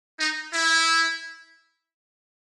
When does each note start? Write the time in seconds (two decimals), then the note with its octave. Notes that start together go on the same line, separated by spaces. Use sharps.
0.19 D#4
0.53 E4